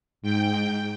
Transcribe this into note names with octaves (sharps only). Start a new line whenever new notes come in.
G#2 G5